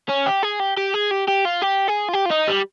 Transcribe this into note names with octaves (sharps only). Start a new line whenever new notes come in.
C#4
G4
G#4
G4
G4
G#4
G4
G4
F4
G4
G#4
F4
G4
F4
D#4
G3